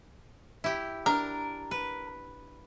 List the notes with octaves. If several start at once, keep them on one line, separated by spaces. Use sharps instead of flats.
E4 G4
D4 A#4
B4